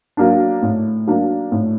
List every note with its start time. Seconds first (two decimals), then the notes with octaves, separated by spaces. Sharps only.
0.17 F#3 A#3 D4
0.63 A2
1.07 F#3 A#3 D4
1.52 A2